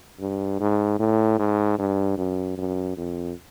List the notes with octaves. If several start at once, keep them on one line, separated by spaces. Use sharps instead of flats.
G2
G#2
A2
G#2
G2
F#2
F#2
F2